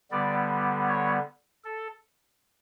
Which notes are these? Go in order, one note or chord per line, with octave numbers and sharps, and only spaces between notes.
D3 G3 B3 D5
C#5
A4